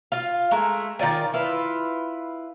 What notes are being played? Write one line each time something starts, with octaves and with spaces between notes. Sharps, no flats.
F4 F5
G#3 A3 A#4 G#5
D#3 F4 D5 G#5
E4 F4 B4